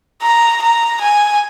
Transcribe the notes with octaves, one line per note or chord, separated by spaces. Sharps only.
A#5
A#5
G#5